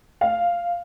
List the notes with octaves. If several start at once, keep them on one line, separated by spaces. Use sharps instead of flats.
F5